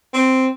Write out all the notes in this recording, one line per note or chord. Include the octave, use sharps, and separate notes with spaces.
C4